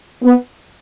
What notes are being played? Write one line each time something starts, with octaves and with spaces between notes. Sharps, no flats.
B3